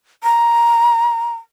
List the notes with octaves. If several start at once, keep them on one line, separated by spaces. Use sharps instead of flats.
A#5